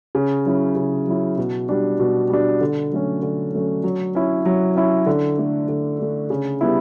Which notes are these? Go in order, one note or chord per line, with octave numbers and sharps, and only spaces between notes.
C#3
F#3 C#4 E4
C#3
F#3 C#4 E4
B2
G3 D4
B2
G3 D4
D3
F#3 A3 C#4
D3
F#3 A3 C#4
F#3
C#4 E4
F#3
C#4 E4
D3
A3 D4
D3
A3 D4
C#3
G3 B3 E4